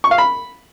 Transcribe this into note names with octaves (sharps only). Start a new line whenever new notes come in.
C#6
F5
B5